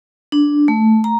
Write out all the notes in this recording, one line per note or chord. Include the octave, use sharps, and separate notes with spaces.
D4
A3
A#5